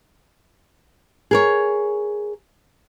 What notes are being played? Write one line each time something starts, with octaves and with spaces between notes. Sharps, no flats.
G#4 A#4 C#5